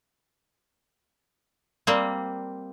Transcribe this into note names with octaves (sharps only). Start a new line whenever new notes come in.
G3 A#3 C4